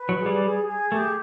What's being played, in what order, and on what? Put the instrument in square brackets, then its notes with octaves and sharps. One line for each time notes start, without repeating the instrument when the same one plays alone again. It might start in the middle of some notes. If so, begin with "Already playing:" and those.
Already playing: [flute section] B4
[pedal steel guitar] F#3
[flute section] G#4
[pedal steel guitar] G3
[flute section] G#4
G#4
[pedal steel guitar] A3 [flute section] G4